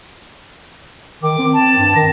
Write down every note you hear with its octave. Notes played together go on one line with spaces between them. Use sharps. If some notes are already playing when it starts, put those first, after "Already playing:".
D#3 D6
C4
A5
G2
D#3 A#6